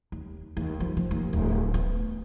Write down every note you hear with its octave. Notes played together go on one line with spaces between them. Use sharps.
D#2
D#2
F3
F3
D#2
D1
B3